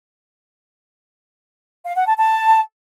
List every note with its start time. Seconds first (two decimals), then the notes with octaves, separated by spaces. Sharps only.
1.85 F5
1.96 F#5
2.07 A5
2.17 A5